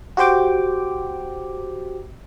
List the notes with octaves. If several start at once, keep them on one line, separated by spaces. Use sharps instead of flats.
F#4 G4 C5 G5 D6